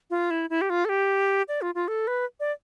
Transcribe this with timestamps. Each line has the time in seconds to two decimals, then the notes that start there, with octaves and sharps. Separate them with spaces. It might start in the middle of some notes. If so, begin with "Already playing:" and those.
0.10 F4
0.31 E4
0.50 E4
0.61 G4
0.70 F4
0.85 A4
0.89 G4
1.48 D5
1.62 F4
1.75 F4
1.88 A4
2.07 B4
2.40 D5